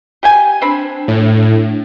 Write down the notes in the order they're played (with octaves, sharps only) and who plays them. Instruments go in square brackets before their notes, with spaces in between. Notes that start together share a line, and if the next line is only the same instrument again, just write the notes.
[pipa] G4 G5 G#5
[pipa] C4 B5 [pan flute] D4
[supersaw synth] A2